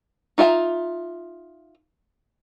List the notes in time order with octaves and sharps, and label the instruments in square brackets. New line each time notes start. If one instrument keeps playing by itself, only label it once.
[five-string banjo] D#4 F4 E5 G5 A#5